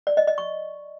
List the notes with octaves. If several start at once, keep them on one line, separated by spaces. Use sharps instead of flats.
D5
D#5
D#5
C#6